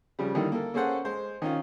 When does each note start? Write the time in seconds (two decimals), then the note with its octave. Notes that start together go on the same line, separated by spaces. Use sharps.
0.19 C#3 F3 G3
0.35 D3 D#3 G3 A#3 E4
0.52 A#3 A4
0.74 A#3 C#4 G#4 A4 C5 F#5
1.05 G#3 C5
1.42 D#3 C#4 F4